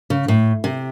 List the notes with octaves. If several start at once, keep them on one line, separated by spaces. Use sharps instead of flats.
C#3
A2
C3